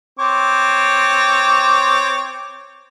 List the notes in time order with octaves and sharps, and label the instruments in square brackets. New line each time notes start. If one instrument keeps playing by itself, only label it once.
[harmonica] C4 C#5 D6